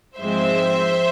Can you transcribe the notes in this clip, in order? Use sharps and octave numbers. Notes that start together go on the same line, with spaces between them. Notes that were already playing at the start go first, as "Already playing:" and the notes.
G#2 F3 G#3 C4 C5 E5